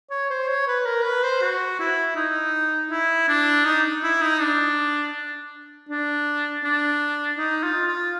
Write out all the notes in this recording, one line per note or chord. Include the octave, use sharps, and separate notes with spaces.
C#5
C5
C#5
B4
A#4
B4
C5
F#4
E4
D#4
E4
D4
D#4
E4
D#4
D4
D4
D4
D#4
F4
F4